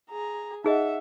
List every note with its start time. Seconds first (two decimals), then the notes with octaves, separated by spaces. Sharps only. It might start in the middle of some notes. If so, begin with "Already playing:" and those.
0.10 G#4 A#5
0.64 D#4 G#4 D#5 E5 F#5